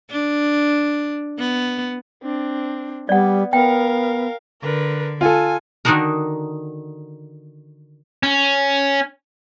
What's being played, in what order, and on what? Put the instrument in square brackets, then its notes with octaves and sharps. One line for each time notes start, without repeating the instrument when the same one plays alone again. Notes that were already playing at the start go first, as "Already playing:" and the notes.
[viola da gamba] D4
B3
[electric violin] C4 D4
[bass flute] G3 [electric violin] B3 [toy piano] D5 F#5
[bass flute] B3 [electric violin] A#4 F5 [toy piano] G5
[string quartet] D3 [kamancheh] A#4 B4
[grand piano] F4 A4 [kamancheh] G#5
[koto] D3 D#3 D4 D#4 F#4 A#4
[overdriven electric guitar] C#4